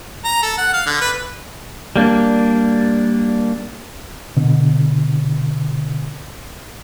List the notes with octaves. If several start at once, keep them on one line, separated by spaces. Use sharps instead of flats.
A#5
A4
F#5
F5
D3
B4
G3 A#3 D4
B2 D3